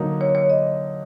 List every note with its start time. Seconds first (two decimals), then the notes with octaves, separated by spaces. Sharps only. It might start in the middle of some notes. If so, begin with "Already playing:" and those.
Already playing: D3 F#3 A#3 D#4
0.21 C#5
0.35 C#5
0.50 D#5